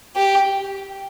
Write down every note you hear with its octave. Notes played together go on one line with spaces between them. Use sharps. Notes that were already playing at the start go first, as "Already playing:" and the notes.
G4